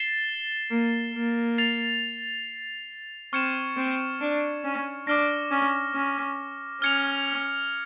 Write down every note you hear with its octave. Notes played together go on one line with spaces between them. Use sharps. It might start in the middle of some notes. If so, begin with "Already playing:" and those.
Already playing: A6 C7 E7 G7
A#3
A#3
A6 C7 F7
C4 C#6 F6 G#6 C#7 E7
C4
D4
C#4
D4 D6 F6 A#6
C#4
C#4
C#4 F6 G#6 C#7 F7